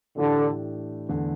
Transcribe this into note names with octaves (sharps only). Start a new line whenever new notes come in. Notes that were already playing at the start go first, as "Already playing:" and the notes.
A2 D3 E3 A3 D4 G4
E2 D3 A3